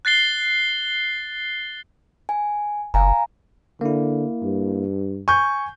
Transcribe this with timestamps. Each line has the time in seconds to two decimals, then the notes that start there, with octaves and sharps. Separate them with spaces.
0.05 F#6 A6 C7 G7
2.29 G#5
2.94 F#1 F5 G#5 A#5
3.81 D3 A#3 E4
4.43 G2
5.28 G#5 C#6 G6